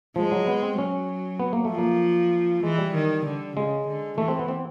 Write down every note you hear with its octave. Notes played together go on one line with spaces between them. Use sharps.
F3 G#3
F#3
B3
C4
F#3 C#4
B3
A#3
A3
F3
A#3
E3 G#3
G3
D#3
D3
C#3 G#3
D3
E3 A3
C4
B3
C4